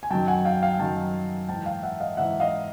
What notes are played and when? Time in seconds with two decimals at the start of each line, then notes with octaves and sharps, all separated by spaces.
0.03 G#5
0.10 F#2 D#3 F#3 G5 A5
0.28 F#5 G#5
0.45 F5 G5
0.63 F5 G5
0.79 F#2 D#3 F#3 G5 A5
1.48 G#2 E3 G5 A5
1.66 F5 G5
1.83 E5 F#5
2.00 D#5 F5
2.17 G#2 E3 E5 F#5
2.40 D#5 F5